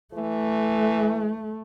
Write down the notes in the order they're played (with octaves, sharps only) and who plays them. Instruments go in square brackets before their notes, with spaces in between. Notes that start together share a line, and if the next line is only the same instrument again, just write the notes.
[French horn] E3 [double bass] A3